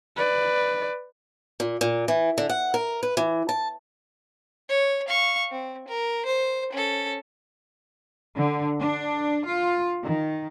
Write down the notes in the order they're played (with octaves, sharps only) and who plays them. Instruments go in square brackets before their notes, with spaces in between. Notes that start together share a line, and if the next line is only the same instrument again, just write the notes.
[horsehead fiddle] B4 D5
[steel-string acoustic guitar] A#2
A#2
E3
D3
F#5
A#4
B4
E3
A5
[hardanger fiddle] C#5
F5 C#6
C4
A#4
C5
C#4 A4
[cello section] D3
D4
F4
D#3